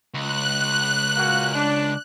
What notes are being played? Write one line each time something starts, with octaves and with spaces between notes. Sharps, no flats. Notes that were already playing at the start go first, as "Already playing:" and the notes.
C#2 F#6
A#2 A#3 F#4
D4